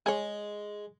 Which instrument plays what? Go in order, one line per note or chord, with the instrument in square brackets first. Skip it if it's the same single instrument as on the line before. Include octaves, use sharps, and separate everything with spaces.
[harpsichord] G#3 [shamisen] G#4 C#5